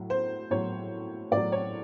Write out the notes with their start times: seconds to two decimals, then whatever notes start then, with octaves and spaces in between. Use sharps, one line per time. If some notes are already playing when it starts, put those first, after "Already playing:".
Already playing: A2 F#3
0.10 C5
0.50 A2 F#3 C#5
1.31 A2 F#3 D5
1.52 C#5